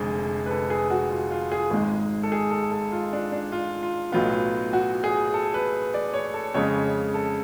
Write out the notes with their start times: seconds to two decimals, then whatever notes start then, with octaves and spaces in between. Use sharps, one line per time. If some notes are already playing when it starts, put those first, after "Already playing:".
Already playing: F1 F2 D3 G#3 G#4
0.46 B4
0.51 A4
0.70 G#4
0.90 F#4
1.11 F4
1.31 F4
1.52 G#4
1.71 G#1 G#2 G#3 G#4
2.23 A4
2.32 G#4
2.51 A4
2.71 A4
2.92 F4
3.13 D4
3.32 D4
3.52 F4
3.83 F4
4.12 B1 A2 F#3 B3 F4
4.73 F#4
5.04 G#4
5.34 A4
5.54 B4
5.94 D5
6.14 C#5
6.34 A4
6.54 F2 C#3 G#3 C#5
7.14 A4